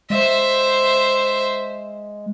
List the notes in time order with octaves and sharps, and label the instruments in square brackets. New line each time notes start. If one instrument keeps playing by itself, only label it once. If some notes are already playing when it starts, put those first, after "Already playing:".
[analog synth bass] G#3 [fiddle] C5 E5